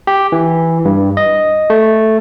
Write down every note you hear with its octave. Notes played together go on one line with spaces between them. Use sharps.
G4
E3
G2
D#5
A3